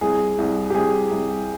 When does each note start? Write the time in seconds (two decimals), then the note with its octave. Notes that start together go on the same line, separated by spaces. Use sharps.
0.01 C2 G#4
0.38 C2
0.70 G4
0.74 C2 G#4
1.11 C2